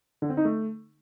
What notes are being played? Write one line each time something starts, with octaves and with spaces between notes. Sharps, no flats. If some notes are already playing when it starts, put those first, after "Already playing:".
D3
C4
D#4
A3